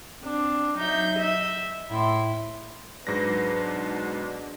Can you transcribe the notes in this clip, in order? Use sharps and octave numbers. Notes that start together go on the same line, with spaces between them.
C4 D4
F#3 D#4 E5 G6
D#5 E5
A2 E4 C6
G#2 F#3 D4 B4 A#6
B2